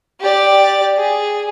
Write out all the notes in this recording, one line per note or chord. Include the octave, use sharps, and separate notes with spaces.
G4 D5
G#4